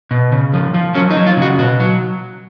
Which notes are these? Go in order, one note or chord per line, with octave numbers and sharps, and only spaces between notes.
B2
C#3
F3
F3
F#3 C#4
D#4
F#3
F4
C#3 F#4
B2 F#4
F#3